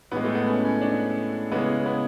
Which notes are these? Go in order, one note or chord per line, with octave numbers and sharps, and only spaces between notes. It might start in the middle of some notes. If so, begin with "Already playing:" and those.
A2 E3 G#3 B3
A3
B3
C#4
C#4
D4
C#3 E3 G#3 B3
B3